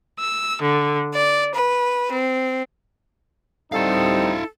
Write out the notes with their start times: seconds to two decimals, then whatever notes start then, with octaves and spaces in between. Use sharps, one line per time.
0.18 E6
0.62 D3
1.13 D5
1.54 B4
2.12 C4
3.72 G3 C4 D#4 E4 A4 F5